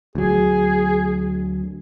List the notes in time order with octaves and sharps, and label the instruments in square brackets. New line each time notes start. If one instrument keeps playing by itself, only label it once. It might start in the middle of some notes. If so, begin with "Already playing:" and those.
[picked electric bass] D2 F#3 [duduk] G#4